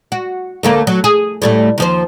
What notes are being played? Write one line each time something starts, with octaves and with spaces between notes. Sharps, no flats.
F#4
D2 A3 A#3
F#3
G#4
A2 G3 A3
D#2 F3 C5